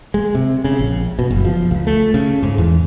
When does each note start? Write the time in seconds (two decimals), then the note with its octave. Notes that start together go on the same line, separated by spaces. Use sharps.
0.14 G#3
0.35 C3
0.64 C#3
0.79 A#1
1.19 B2
1.31 F#1
1.45 F3
1.71 C#2
1.87 A3
2.14 C#3
2.43 G#2
2.58 E2